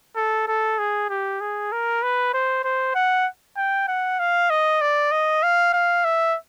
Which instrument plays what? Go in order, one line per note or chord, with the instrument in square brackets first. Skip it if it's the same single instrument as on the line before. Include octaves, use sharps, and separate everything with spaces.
[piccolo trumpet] A4
A4
G#4
G4
G#4
A#4
B4
C5
C5
F#5
G5
F#5
F5
D#5
D5
D#5
F5
F5
E5